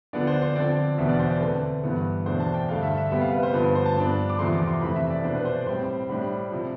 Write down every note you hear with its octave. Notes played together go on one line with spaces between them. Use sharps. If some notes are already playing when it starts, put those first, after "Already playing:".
D3 F3 B3 D4 D5
C5
C5
D3 F3 C4 D5
E2 B2 B3 D4 E5
D5
C5
D5
D3 A3 C4 B4
G2 E3 B3
E2 B2 A3 D4 C5
A5
G5
G2 D3 A3 D4 F5
E5
E5
C3 G3 B3 E5
F5
B4
C5
G2 D3 F3 B3 B4
C5
A5
G2 F3 B3 D4
D6
E2 C3 F3 A3 C4 C6
D6
C6
F2 C3 E3 A3 B5
E5
D5
B2 B3 D4 C5
B4
C5
D5
A2 G3 C4 C5
A2 G3 D4
C3 F3